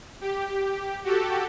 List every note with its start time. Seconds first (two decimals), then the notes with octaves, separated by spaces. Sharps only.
0.21 G4
1.04 F#4 G4 A4